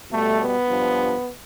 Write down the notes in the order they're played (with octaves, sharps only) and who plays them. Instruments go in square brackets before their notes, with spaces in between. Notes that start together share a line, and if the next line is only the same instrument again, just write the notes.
[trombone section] B2 G3 A3
B3
G2 F3